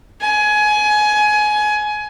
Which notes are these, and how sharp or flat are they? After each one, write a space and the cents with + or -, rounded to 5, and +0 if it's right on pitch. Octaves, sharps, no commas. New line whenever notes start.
G#5 +20